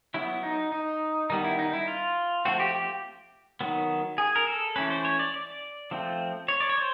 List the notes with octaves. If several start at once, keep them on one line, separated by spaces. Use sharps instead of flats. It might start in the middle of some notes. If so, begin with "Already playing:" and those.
F#3 B3 E4
D#4
D#4
D#3 G3 B3 D#4
E4
D#4
E4
F4
F3 A3 C4 F#4
G4
G4
D#3 F#3 B3
G#4
A#4
A4
E3 A3 C#4 B4
C5
C#5
D5
D5
F3 A3 C4
C#5
D5
C#5
C5